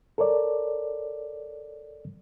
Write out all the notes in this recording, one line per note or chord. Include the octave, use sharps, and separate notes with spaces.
A4 A#4 C#5 D5